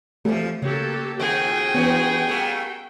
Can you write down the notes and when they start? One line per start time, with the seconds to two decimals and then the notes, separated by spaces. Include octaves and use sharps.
0.25 E2 F3 A3 G4
0.62 C#3 F#3 A#3 G4 A4
1.20 F2 D#3 F#4 G#4 G5
1.75 G2 E3 B3 C#4
2.27 G3 A3 A#3